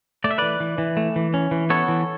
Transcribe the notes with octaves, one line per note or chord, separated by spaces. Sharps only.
A3 D5
E5
E3 B4 D5
E3
E3
A3
E3
C#4
E3
B3 A4 C#5
E3